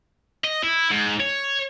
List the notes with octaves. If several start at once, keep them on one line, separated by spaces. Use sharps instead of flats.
D#5
E4
G#2
C#5